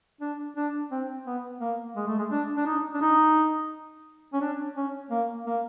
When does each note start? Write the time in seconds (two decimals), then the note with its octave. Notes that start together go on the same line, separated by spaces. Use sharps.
0.21 D4
0.57 D4
0.91 C4
1.26 B3
1.61 A#3
1.96 G#3
2.07 A3
2.19 G#3
2.31 D4
2.57 D4
2.66 D#4
2.94 D4
3.01 D#4
4.33 C#4
4.41 D4
4.77 C#4
5.11 A#3
5.46 A#3